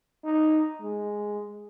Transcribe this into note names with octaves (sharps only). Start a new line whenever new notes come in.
D#4
G#3